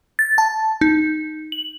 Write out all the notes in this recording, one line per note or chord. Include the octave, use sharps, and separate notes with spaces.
A6
A5
D#4
F#7